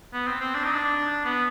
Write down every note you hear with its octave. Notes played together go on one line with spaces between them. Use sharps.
B3
C4
C4
D4
D#4
D4
B3